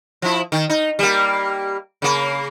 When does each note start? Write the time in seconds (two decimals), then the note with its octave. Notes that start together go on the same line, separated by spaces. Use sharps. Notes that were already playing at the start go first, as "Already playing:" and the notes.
0.22 F3 E4
0.52 D#3
0.70 D#4
0.99 G3 A#3
2.02 C#3 A#3